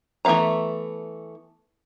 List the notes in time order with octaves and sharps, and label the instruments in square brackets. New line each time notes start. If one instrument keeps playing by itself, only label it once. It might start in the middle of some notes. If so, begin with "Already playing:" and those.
[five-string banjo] E3 A3 B3 F5 A#5